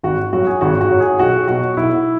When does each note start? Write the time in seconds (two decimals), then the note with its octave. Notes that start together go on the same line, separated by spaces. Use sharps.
0.03 G#1 F#4
0.33 F#2 F#3 F#4
0.47 G#4
0.61 G#1 F#4
0.81 F#4
0.91 F#2 F#3
1.00 G#4
1.19 B1 F#4
1.48 B2 F#3 F#4
1.77 B1 E4